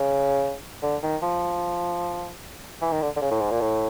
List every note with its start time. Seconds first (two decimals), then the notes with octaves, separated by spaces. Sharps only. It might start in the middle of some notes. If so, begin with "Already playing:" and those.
Already playing: C#3
0.83 D3
1.02 D#3
1.22 F3
2.81 E3
2.92 D#3
3.02 D3
3.16 D3
3.21 C#3
3.31 A2
3.41 G#2
3.51 A#2
3.61 A2